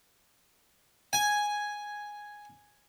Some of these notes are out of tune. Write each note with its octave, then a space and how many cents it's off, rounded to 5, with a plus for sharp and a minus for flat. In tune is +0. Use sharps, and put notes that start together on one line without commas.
G#5 +0